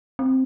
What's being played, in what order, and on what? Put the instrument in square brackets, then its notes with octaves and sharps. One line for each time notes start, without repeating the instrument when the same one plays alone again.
[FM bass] C4